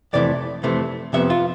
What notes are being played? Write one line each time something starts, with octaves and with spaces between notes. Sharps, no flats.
F2 C3 E3 A3 D5
F2 C3 E3 A3
F2 C3 F3 B3 E5
F4